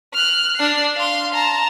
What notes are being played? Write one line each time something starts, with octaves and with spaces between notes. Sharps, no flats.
F6 F#6
D4 C7
F5 C6
A5 A#5